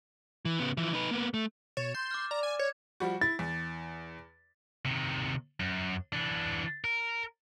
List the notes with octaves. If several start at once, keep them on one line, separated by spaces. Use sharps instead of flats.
E3
C#3 B3
E3 F3
D#4 B4
A#3 B3
A3
B2 C#5 A6 E7
C6 G6
D6 F6
D5 A#5
G#5
C#5 G#6
F3 G3 F#4
E4 A6
E2
C3 D#3
F#2
E3 D4
A#4